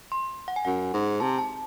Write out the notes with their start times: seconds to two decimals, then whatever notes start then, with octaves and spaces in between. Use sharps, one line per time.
0.12 C6
0.48 F#5
0.56 G#5
0.65 F#2 F#5
0.94 G#2
1.20 C3 A5
1.38 A5